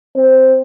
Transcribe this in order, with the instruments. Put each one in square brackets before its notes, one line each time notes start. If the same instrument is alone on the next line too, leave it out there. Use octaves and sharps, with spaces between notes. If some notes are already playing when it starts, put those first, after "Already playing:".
[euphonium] C4